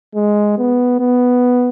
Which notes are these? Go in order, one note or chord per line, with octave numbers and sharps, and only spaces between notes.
G#3
B3
B3